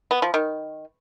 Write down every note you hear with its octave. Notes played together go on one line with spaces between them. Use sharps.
B3
F3
D#3